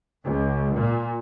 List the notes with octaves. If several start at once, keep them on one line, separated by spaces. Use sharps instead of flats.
C#2
A#2